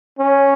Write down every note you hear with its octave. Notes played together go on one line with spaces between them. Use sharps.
C#4